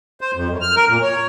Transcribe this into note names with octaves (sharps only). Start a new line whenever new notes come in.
C5
F2
F#2
F6
A#4
A#2
C#5